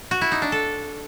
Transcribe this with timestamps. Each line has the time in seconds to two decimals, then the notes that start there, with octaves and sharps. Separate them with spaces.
0.11 F#4
0.21 E4
0.32 D#4
0.42 D4
0.52 A4